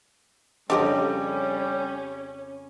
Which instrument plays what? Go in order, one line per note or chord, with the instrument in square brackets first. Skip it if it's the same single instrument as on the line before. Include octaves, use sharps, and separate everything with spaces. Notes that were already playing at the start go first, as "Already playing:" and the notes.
[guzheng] F2 C#3 A#4 [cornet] G3 [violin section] C#4 [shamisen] D4 G4 D#5